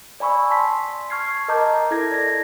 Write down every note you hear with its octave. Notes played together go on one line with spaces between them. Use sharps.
D5 G#5 B5 C#6 E6
A5 C6 B6
C#6 F6 G#6 C7
A#4 D#5 A5 A#5 D6 G6
E4 A4 A#4 G#6 A#6
D5 A#6